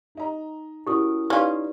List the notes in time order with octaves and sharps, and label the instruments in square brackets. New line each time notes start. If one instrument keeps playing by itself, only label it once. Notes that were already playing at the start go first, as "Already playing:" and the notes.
[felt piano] D#4 D#5 A#5
[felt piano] C#4 F#4 A#4 [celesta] E4 D#6 [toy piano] G4
[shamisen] C#4 F4 [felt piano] D#4 [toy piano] G4 B4 D5